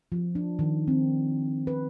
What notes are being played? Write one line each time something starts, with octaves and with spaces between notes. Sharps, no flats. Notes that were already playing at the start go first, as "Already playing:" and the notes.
F3
D4
D#3
C4
B4